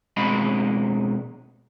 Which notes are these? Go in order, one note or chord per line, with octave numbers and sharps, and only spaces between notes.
B2 G#3 C4 D#5 B5